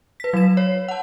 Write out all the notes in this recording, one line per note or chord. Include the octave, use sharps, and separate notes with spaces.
B4 B6
F#3 E7
C#5
F#5 A5